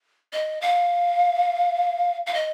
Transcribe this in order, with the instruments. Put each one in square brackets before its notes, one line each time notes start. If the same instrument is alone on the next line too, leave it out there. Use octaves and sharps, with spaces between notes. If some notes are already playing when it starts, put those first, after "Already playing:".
[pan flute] D#5
F5
F5
D#5